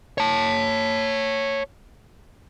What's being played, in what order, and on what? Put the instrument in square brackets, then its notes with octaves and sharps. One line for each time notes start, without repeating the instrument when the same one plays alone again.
[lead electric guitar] C#5 A5